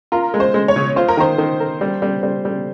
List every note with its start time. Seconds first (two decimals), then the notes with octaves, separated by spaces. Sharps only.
0.12 F4 A#4
0.34 G#3
0.40 C5
0.54 G#3
0.68 C#5
0.76 C#3
0.96 F4 C5
1.08 A#4
1.17 D#3 C5
1.38 D#3
1.60 A#4
1.81 G3
2.02 G3
2.23 G3
2.45 G3